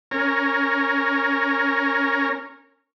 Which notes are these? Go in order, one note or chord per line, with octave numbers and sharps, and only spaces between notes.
C#4 A#4